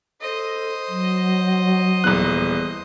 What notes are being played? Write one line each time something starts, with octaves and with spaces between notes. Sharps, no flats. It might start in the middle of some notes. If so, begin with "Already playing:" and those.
A4 C5 D#5
F#3
D#1 E2 F#6